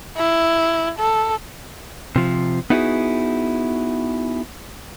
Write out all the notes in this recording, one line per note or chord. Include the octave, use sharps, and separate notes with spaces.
E4
A4
C3 F3
B3 D#4 E4 F#4 G#4